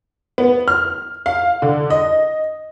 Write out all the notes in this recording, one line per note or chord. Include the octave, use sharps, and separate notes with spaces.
B3
F6
F5
D3
D#5